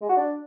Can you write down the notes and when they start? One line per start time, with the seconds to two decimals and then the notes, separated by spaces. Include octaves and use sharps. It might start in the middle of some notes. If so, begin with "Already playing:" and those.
0.01 G#3
0.09 F#4
0.17 D4